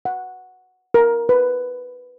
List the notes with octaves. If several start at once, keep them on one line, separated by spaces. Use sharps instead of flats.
F#5
A#4
B4